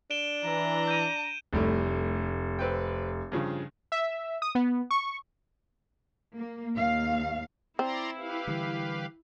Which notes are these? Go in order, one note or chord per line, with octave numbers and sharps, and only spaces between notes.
D4 D7 E7 G7
E3 A#5
G6 D#7
F1 A2 G3 A3
C4 B4 G5
G2 C#3 F3
E5
D#6
B3
C#6
A#3
D#2 F5
C4 E4 D5 A#5 C6
G4 B4 F5
D3 E3 G3